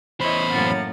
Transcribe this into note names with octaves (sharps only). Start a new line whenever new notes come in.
E2 E4 C5 C#5 D#5 B5
F#2 A2 A#3 F#5 A6